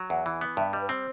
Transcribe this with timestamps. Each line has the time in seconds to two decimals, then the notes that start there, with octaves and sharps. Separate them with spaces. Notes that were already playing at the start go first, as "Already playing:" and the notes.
Already playing: F#3
0.09 E2 F#5
0.26 E3
0.41 B3
0.57 G2 E5
0.73 G3 D#5
0.81 B4
0.89 C4 C5